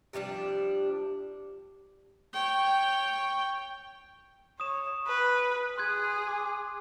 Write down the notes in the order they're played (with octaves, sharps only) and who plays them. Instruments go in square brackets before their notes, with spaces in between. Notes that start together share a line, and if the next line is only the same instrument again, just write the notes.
[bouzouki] C3 F3 G3 D4
[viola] C#5 G5
[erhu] C#5 [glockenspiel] D#6 E7
[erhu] B4
[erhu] G#4 [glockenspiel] C6 F#6 G#6
[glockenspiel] D6